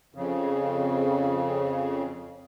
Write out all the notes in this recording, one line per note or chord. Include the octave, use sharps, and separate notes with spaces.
F2 C#3